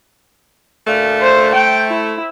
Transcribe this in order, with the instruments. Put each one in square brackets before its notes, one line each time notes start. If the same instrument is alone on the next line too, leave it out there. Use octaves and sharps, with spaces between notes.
[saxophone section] D2 A#2 A3
[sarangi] C5
[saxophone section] A3 [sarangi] G5
[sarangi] E4